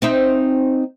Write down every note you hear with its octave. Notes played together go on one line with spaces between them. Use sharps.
C4 D#4 E5